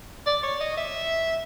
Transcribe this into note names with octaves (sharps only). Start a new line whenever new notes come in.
D5
C#5
D#5
E5